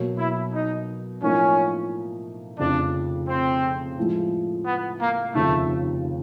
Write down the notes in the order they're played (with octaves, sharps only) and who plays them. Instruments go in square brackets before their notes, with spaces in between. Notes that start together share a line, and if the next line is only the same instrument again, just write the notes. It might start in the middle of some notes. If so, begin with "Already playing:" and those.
Already playing: [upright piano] B2 F#3 A#3
[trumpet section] E4
D#4
[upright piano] A2 F3 A#3 D#4 [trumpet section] C#4
[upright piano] F1 F2 C#3 F3 [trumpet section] D4
[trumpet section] C4
[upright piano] A2 F3 G#3
[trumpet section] B3
A#3
[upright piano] F1 D#2 C#3 F3 [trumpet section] A3